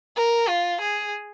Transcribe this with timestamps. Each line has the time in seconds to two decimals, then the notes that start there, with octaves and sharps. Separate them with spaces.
0.16 A#4
0.48 F4
0.81 G#4